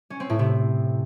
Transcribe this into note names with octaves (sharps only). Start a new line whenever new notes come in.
C#4
C4
A2
C3